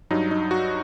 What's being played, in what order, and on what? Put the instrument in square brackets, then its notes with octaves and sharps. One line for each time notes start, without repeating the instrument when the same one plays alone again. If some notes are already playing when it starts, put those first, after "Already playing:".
[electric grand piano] G2 F#3 D#4
D#4
F#4